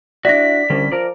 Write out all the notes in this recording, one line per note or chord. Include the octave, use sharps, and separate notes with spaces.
D4 E4 F#4 D5 A#6 B6
C2 D3 G3 C#4
F3 A#4 D5